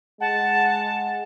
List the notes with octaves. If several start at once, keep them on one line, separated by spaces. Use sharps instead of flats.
G#3 F#5 A5